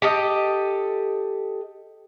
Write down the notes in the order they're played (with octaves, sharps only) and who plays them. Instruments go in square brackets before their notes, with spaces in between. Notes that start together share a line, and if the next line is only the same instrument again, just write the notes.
[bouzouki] G4 A4 D#5